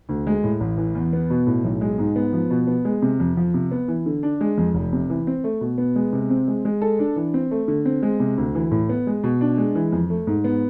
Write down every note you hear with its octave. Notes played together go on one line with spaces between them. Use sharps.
D2
G#3
A2
A1
E3
E2
B3
B2
A2
B1
G#3
G#2
B3
F3
B2
B3
G#3
C3
F2
F3
C3
B3
E3
D3
D4
G#3
F2
F1
C3
E3
C4
A3
B2
B3
G#3
C3
C4
G#3
G#3
A4
D4
E3
C4
A3
D3
C4
G#3
C3
D2
E3
A2
B3
G#3
B2
D4
G#3
E3
F2
A3
G#2
B3